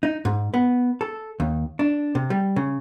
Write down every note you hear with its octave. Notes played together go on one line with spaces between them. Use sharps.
D#4
G#2
B3
A4
D#2
D4
C3
G3
C#3